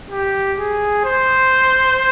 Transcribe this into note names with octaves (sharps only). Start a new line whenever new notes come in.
G4
G#4
C5